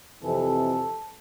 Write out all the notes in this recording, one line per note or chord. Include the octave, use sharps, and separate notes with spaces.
F2 C3 E3 A4